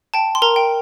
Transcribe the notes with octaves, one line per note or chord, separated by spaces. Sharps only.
G5 A5
C6
A#4 A#5
G5